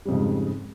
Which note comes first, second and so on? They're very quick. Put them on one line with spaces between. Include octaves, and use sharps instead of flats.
G3 F2 C#3 G#2